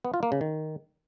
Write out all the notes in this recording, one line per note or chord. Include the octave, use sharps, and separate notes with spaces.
B3
F4
A#3
C#3
D#3